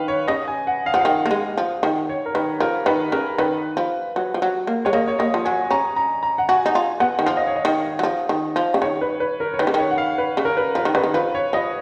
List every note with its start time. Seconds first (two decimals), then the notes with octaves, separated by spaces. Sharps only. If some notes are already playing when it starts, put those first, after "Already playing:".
Already playing: D#3 B4 F5
0.08 C#5
0.28 C#3 D#5
0.48 G#5
0.67 F#5
0.86 F5
0.94 F3 F#5
1.01 D#3 F5
1.26 A#3
1.31 G#3
1.58 F3
1.83 D#3
2.09 C#5
2.26 A#4
2.34 D#3 B4
2.60 F3 A#4
2.86 D#3 B4
3.12 C#3 A#4
3.38 D#3 B4
3.77 F3
4.16 F#3
4.34 F3
4.42 F#3
4.67 A#3
4.85 G#3 C#5
4.93 A#3 D#5
5.07 C#5
5.19 A#3 D#5
5.34 F3
5.45 F#3 G#5
5.71 C#4 A#5
5.96 A#5
6.23 A#5
6.38 F#5
6.49 F#4 G#5
6.66 D#4
6.75 F4
7.00 B3 F#5
7.19 D#3
7.26 F3 F5
7.37 D#5
7.47 C#5
7.56 D#5
7.65 D#3
7.99 F#3
8.03 F3
8.29 D#3
8.56 F3
8.74 C#3
8.82 D#3 C#5
9.01 B4
9.20 B4
9.40 A#4
9.54 C#5
9.59 D#3 B4
9.67 C#3
9.74 D#3 C#5
9.91 F#5
9.98 F5
10.18 B4
10.37 C#3
10.45 A#4
10.57 B4
10.75 F3 A#4
10.85 D#3
10.95 C#3 B4
11.04 D#3
11.14 F3 B4
11.35 C#5
11.53 F3 D#5